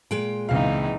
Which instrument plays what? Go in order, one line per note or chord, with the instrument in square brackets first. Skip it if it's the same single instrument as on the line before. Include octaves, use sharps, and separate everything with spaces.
[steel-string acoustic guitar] A#2 G#3 G5
[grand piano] C#2 C4 F5 [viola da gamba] E3 D#4